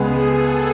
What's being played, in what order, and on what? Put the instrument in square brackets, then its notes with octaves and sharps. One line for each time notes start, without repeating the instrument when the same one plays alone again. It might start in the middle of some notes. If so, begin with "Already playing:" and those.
Already playing: [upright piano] C#2 C#3 G#3 B3 [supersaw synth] G#4
[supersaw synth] A4